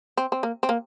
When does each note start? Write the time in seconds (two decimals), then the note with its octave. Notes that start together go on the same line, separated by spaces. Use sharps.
0.17 C4
0.32 C4
0.43 A#3
0.63 C4
0.69 A#3